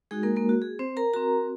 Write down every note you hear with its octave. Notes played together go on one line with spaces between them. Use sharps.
G#3 D#4 F#4 G#4
A#3 A#4
A#3 A#4
F#4
G#4
C4 C5
A#4 A#5
C4 F#4 A#4 A#5